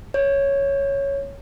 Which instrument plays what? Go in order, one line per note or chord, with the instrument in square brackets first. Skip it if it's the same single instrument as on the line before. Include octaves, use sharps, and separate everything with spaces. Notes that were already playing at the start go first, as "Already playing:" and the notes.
[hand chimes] C#5